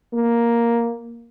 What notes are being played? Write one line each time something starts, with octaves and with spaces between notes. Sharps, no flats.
A#3